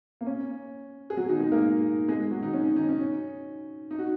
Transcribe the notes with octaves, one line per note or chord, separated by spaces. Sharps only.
A#3
C#4
G#4
F#3 F#4
D#3 D#4
G#3 G#4
A#3 A#4
G#3 G#4
F#3 F#4
D#3 D#4
C#4
C#4
D#3 D#4
C#4
D#4
F#4